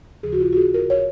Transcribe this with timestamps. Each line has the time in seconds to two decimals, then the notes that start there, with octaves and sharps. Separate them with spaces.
0.23 D#2 C#3 F3 G#4
0.33 F#4
0.40 F4
0.53 F#4
0.56 G#4
0.74 A#4
0.90 C#5